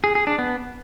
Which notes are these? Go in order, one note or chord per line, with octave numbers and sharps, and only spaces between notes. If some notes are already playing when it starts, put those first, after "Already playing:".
G#4
G#4
D4
B3